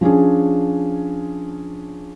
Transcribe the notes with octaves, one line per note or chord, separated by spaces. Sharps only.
F3 C#4 D4 G#4